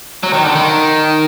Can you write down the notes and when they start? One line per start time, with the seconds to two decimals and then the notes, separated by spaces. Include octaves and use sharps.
0.23 F#3
0.33 D#3
0.45 D3
0.55 D#3